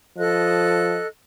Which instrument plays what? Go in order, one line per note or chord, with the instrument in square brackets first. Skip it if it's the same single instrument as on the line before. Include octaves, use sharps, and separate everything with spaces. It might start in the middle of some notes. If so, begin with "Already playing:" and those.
[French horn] F3 [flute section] A4 D#5 F#6